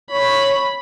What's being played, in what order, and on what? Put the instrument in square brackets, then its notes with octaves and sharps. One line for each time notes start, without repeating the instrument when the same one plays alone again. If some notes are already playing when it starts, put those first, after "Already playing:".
[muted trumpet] C#5 [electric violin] B5